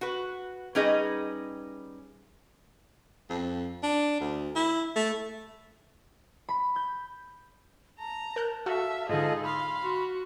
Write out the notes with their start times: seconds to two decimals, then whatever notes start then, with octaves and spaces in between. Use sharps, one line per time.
0.01 F#4 B4
0.75 G3 C#4 D#4 G#4 B4 D#5
3.30 F2
3.83 D4
4.20 D2
4.55 E4
4.96 A3
6.49 B5
6.76 G6
7.99 A5 A#5
8.36 A#4 F#6 G6
8.66 F#4 A4 E5 F5
9.09 G#2 D3 D#4 F4 G#4 A4 D#5
9.45 F5 B5 C6
9.82 F#4